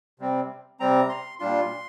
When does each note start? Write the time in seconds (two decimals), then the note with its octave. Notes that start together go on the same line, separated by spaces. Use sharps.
0.19 C3 G3 C4
0.80 C3 G3 C4 A#5
1.09 C6
1.39 A#2 G3 D4 F4 C6